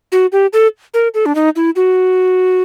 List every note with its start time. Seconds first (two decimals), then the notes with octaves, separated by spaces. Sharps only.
0.12 F#4
0.32 G4
0.53 A4
0.94 A#4
1.14 A4
1.26 D4
1.35 D#4
1.56 E4
1.76 F#4